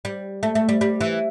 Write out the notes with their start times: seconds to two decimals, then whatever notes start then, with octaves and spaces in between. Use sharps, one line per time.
0.05 G3
0.43 A3
0.55 A3
0.69 G3
0.81 G3
1.01 E3